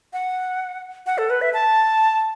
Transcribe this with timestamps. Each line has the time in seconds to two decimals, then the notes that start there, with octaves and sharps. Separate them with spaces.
0.13 F#5
1.06 F#5
1.18 A4
1.30 B4
1.42 E5
1.53 A5